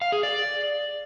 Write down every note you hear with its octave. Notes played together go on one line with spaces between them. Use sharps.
F5
G#4
D5